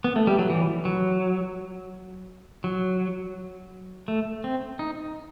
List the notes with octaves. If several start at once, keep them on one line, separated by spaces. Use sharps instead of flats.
B3
A3
G3
F#3
E3
F#3
F#3
A3
C4
D#4